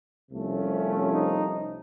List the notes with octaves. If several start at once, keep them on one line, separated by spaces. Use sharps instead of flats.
C2 C3 F3 A3 C#4
D#4